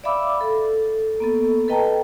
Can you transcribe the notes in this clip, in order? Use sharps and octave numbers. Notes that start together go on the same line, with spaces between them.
D5 E5 F5 B5 D6 E6
A4
A#3 B3 A4
A4 B4 D#5 G5 A5 A#5